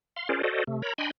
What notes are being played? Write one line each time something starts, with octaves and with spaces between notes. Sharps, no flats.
F5 C6
C#4 F4 G#4 A#4 C5 D5
F#4 A4 C5 D5 D#5
C3 A3
A#4 C#5 A#5 B5
D4 D#5 G5 G#5 B5 C6